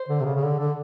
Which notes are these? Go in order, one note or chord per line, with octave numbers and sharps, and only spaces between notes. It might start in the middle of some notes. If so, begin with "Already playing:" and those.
Already playing: C5
D3
C3
C#3
C#3
D3
D3